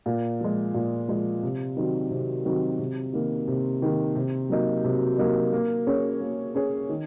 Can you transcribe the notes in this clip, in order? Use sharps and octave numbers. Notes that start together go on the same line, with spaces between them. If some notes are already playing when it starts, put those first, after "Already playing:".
A#2
F3 G#3
A#2
F3 G#3
C3
D#3 F#3 C4 F#4
C3
D#3 F#3 C4 F#4
C3
D#3 A#3
C3
D#3 A#3
C3
F#3 A#3 D#4
C3
F#3 A#3 D#4
A#3
C#4 G#4 C#5
A#3
C#4 G#4 C#5
D#3